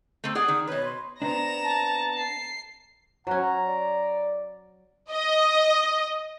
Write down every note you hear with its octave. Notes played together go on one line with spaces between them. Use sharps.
A3 A#3 C4
G#4 D5 F#5 D#6
D#3
B2 B4 C#5
C6
B3 C4 D4 A#5 A#6 E7
A5
C7
F#3 C#4 F#5 A#5
D5
D#5